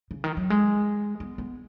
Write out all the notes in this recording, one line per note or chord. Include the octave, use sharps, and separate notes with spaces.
C#3
D#3
F#3
G#3
B3
B3